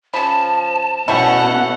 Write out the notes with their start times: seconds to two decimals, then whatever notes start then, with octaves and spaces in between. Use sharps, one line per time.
0.14 C#3 F3 A5 B5
1.08 B2 G3 A3 C#4 E4 F#5